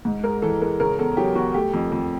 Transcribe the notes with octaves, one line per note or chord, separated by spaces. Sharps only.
G#2
G#3 A#4
E3 A4
G#3 A#4
C#3 A#4
E2 A4
F#3 G4
E2 F#4
A3 G4
F2
F2